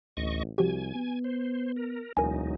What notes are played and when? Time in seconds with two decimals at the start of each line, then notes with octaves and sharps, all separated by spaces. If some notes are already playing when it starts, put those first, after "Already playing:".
0.17 A1 D2 D#5 C#6
0.58 C2 F3 F#4 G4 G#5
0.95 B3
1.24 C5
1.76 A#4
2.17 E1 D2 F#3 D#4 A#4 G#5